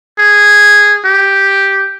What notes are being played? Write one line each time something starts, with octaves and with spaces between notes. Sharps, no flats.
G#4
G4